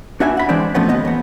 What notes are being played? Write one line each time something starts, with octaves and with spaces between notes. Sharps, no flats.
D4 F#4 B4 E5 F#5 G#5
F#5 B5
E3 G#3 C4 D4 C5 D5
A2 F3 A3 B3 C#4
D#2 B3 D#5
E2 B3